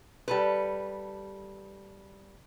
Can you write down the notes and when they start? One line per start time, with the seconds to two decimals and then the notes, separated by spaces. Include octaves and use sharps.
0.28 G3 A4 B4